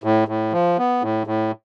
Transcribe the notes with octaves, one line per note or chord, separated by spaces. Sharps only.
A2
A2
F3
B3
A2
A2